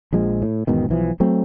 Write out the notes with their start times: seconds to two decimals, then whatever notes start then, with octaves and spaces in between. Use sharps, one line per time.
0.13 A#1 F3 G#3
0.42 A2
0.67 E1 G#2 B2 D#3
0.89 B1 E3 F3
1.20 F#3 A3 C4